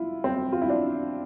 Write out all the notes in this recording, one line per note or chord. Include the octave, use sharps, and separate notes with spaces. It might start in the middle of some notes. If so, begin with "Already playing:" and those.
Already playing: E4 F4
C4
F4
E4
D4